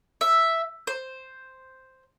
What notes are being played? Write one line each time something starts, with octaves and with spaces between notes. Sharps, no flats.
E5
C5